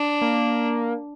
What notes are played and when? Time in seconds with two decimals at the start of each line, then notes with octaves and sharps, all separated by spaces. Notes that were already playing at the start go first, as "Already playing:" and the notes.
Already playing: D4
0.22 A#3